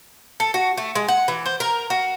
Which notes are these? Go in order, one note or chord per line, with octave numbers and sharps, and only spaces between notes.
A4
F#4
A3
G#3
F#5
E3
C5
A#4
F#4